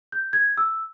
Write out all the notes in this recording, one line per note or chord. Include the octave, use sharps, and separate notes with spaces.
G6
G#6
E6